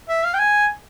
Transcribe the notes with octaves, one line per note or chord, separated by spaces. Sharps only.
E5
F5
G5
G#5